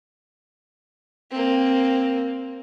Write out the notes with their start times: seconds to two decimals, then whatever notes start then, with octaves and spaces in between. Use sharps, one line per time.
1.31 A#3 C4